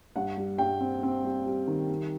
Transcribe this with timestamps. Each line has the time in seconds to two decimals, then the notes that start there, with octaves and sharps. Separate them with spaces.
0.16 G2 F#5
0.37 G3
0.58 G2 G5
0.80 C4
1.03 C4
1.24 G3
1.46 G3
1.67 D#3
1.89 G3